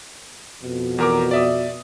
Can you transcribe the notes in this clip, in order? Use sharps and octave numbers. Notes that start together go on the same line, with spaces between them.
F2 B2
E2 A#4 D6
D5 E5 D#6